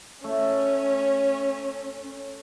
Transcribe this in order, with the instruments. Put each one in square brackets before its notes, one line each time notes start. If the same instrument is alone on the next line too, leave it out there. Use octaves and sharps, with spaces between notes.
[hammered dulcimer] A3 [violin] C#4